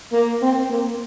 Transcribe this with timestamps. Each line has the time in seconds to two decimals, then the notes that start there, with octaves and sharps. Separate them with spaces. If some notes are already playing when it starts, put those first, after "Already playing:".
0.12 A#3
0.42 C4
0.70 A#3